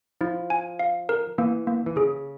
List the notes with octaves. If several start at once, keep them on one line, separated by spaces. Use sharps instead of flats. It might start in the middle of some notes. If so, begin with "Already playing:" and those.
F3 E4
G#5
F5
A#4
E3 A#3
A#3
E3
C#3 G#4